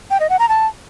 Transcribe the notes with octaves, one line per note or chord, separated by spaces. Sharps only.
G5
D#5
F#5
A#5
A5